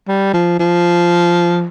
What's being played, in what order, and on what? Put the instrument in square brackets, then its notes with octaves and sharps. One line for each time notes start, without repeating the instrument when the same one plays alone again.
[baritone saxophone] G3
F3
F3